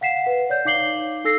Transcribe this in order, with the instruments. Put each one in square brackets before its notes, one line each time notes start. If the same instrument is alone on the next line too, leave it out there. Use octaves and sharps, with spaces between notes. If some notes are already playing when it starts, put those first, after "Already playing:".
[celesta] F5 F#5 B6 C7 E7
B4 F#5
C#5 D5 G6
D#4 F5 D6 C7 F#7 G7
D#4 A4 E6 A#6 C7